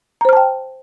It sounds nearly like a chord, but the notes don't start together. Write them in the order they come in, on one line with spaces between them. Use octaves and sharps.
A#5 C5 F6 A5 G5